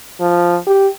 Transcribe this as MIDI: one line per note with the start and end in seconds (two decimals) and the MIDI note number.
0.20 0.57 53
0.67 0.87 67